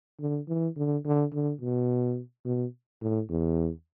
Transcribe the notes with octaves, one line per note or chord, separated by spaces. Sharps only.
D3
E3
D3
D3
D3
B2
B2
A2
E2